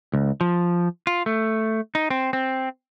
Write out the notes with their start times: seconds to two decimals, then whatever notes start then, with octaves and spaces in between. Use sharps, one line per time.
0.14 C#2
0.41 F3
1.07 F4
1.26 A3
1.95 D#4
2.10 C4
2.33 C4